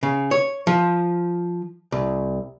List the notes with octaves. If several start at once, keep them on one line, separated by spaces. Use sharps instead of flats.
C#3
C#5
F3
C2